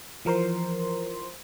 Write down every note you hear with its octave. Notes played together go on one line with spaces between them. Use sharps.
E3 F3 A#4 C5 C6